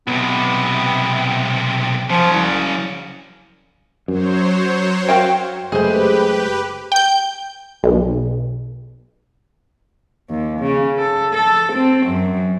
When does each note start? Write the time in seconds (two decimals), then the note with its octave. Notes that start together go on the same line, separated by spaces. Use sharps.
0.07 B1 C3 B3
2.10 C#3 F3 F#3
2.33 C2
4.08 F#2 F#3 C5 C#5
5.09 F#4 F5 G5
5.72 F#1 G#3 A3 G4 G#4 B4 C5
6.92 G5 G6
7.83 B1
10.30 D#2
10.60 C#3
10.98 A4
11.33 A4
11.73 C4
12.07 F#2